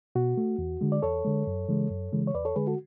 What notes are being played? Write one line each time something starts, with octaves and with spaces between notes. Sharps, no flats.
B2 F#4
A3
E2
D3 G#3
D5
E2 A4 C#5
D3 G#3
F#2
C#3 E3 G#3
F#2
C#3 E3 G#3
C#5
E2 B4 D5
A4 C#5
D3 G#3 G#4 B4
F#4 A4